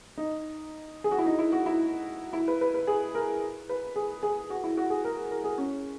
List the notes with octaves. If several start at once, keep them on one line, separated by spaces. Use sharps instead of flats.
D#4
G#4
F#4
E4
D#4
E4
F#4
E4
E4
B4
B4
B4
G#4
A#4
B4
G#4
G#4
F#4
E4
F#4
G#4
A#4
A#4
G#4
C#4